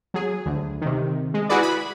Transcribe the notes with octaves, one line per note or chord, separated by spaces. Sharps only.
F#3 G#4
D2
C3 D#3
G#3
E4 F#4 G#4 B4 D5
B5